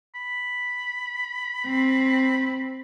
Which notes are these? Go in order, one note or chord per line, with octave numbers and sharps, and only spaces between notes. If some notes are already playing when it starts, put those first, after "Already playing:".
B5
C4